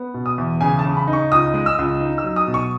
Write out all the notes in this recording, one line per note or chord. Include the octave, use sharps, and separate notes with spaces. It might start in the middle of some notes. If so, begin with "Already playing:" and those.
Already playing: B3
B2
D#6
E2
C#3 G#5
A5
C#3
B5
D#4
C#6
C#2 D#6
G#3
E6
C#2
D#4
E6
F#3
D#6
B2
C#6